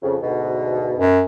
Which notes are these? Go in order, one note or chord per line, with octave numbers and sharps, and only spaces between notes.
F2 C#3
D2 G#2 B2
F#2